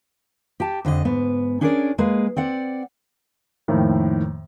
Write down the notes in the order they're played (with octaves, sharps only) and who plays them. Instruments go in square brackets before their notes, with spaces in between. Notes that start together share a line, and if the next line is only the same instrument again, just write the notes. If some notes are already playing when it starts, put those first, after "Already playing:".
[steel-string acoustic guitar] G4 G5 A5
F2 D3 G4 D#5
G#2 B3
C#4 D4 G#4 A#4 C5 D5
G#3 A#3 G#4 B4
C4 D5 F#5
[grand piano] F2 A2 D#3 A#3